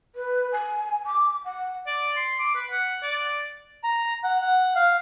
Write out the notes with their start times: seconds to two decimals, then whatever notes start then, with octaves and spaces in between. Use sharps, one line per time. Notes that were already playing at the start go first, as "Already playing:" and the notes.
0.15 B4
0.52 G#5
1.06 D6
1.45 F#5
1.87 D5
2.16 C6
2.39 D6
2.55 B4
2.71 F#5
3.03 D5
3.84 A#5
4.24 F#5
4.41 F#5
4.76 F5